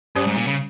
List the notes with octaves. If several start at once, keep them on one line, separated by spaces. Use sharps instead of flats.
G2 G3 C#4 G4 C5
G#2
A#2
C#3